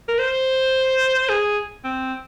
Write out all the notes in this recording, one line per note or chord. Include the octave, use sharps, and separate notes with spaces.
A#4
C5
G#4
C4